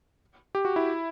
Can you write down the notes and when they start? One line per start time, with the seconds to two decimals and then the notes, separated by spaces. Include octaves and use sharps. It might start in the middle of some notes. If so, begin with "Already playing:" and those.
0.55 G4
0.65 F#4
0.76 E4